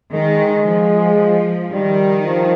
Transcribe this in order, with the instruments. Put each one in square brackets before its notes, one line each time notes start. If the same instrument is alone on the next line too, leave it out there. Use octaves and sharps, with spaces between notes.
[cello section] D#3 [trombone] G#3
[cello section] F3
[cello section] D#3 [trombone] G3
[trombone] F3